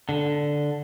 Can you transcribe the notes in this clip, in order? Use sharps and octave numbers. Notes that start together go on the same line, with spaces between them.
D3